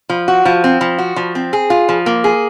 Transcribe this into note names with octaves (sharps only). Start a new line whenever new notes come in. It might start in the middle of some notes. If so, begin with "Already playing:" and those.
F3
F#4
F3
C4
F3
F#4
F3
C4
G#4
F4
F3
A#3
G#4